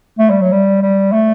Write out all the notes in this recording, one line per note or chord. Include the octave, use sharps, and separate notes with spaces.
A3
G3
F#3
G3
G3
A3